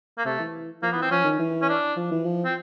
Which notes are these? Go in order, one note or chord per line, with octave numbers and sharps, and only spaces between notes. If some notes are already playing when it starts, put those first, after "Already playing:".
A#3
C3 A3
E3
F3 A#3
B3
E3
C4
F3 C#4
D#3
E3
C#4
D4
F3
E3
F3
C4